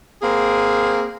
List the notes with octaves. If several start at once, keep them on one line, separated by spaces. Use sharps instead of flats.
A#3 C4 G#4